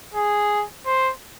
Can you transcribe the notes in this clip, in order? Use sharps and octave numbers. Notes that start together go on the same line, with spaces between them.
G#4
C5